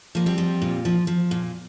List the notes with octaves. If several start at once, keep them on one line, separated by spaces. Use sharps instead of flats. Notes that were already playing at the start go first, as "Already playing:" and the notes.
F3 A#3
G3 C4
F3
A#2
F3
F3
A#2